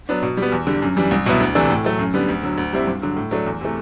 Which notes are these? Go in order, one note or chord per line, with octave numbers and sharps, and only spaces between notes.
F#3 B3 D4
B2
G3
B3
E2
D3 G3
F#2
E3 G3 D4
C2
B2 F#3 B3 E4
D2
C3 E3 A3 D4
A2
F#3 A3
F#2
D3 G3 B3
D2
D3 F#3
D2
C3 G3 C4 E4
G2
D3 F#3
A2
F#3 A3 D4
E2
C3 E3 A3